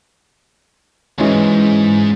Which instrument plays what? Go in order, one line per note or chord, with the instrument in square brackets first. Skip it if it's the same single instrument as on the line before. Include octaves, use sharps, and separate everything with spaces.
[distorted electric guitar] D2 G#2 [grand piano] E3 G#3 C#4